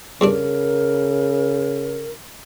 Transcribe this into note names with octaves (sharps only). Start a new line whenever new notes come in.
E2 G2 C#3 D4 A#4